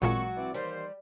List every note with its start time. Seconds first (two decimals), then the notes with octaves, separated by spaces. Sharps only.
0.02 A1 A#2 F#3 G#3 A#3 C4 F#4 C#6
0.36 E3 C4 D5
0.54 D#2 E3 G3 C5